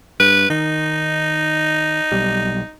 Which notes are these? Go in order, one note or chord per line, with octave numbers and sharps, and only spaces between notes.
G2 B4
D#3 D#4
B1 G3